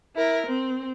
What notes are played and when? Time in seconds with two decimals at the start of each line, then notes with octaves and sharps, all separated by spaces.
0.16 E4 A#4
0.47 C4